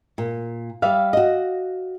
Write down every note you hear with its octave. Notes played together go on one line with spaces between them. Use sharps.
A#2
G3 D5 E5 F5
F#4 D#5